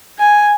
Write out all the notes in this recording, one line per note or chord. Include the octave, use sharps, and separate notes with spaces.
G#5